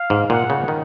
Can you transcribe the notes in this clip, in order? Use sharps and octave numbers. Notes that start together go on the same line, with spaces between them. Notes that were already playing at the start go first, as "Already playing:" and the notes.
Already playing: F5
G#2
A#2 F#5
C#3
D#3